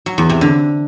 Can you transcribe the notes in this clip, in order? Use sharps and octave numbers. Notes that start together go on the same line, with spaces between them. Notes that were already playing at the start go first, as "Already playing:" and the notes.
F#3
E2
C3
D3